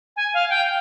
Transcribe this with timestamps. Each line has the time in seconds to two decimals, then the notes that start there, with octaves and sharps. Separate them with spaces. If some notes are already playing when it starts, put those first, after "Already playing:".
0.16 G#5
0.34 F5
0.50 G5